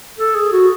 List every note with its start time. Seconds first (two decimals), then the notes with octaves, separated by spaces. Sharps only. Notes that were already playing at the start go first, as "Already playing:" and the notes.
0.19 A4
0.35 G#4
0.52 F#4